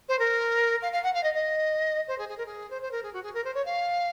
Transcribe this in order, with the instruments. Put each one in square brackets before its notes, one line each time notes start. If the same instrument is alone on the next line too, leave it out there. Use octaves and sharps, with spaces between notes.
[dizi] C5
A#4
F5
F5
F#5
F5
D#5
D#5
C5
G#4
G#4
A#4
G#4
C5
C5
A#4
G#4
F#4
G#4
A#4
C5
C#5
F5